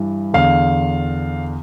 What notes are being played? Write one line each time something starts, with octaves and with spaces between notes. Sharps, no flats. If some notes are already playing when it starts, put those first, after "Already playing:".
Already playing: G2 E3
E2 D3 F5